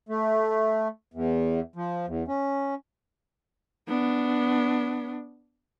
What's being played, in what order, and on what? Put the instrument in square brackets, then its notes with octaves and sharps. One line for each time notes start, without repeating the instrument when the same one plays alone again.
[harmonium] A3
E2
F3
E2
C#4
[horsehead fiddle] B3 D4